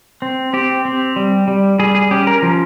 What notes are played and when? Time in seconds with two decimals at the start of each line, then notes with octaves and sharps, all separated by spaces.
0.22 C4
0.53 C4 G4
0.85 C4
1.16 G3
1.48 G3
1.79 G3 G#4
1.95 G#4
2.11 C#4 G4
2.27 A#4
2.42 F3